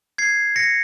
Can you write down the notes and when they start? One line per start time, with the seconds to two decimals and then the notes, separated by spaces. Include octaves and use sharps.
0.18 G#6 C7
0.56 A#6 C#7